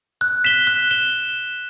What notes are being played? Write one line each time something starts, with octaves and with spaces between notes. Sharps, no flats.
F#6
B6 E7 G7
F#6
E7 G7